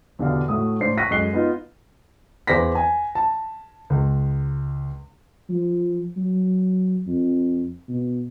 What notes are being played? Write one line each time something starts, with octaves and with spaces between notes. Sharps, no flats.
E2 B2 D3 G4 D5 F5
A2 A3 F#4 E5 D#6
A2 D4 C5 C7
C#6 F#6 A#6 B6 D#7
F#2 G#3 A4 F#6 C7 G7
B3 D#4 F4
E2 G#4 C5 D5 A#6 B6
G#5
A5
C#2
F3
F#3
F2
B2